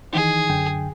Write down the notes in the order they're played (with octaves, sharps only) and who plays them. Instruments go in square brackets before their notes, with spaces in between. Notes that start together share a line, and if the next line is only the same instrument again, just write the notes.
[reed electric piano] D#3 E3 D#4 [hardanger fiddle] G#4
[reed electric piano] F#2 D3 G5